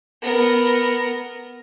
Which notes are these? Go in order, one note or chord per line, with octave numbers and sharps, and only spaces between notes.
B3 A#4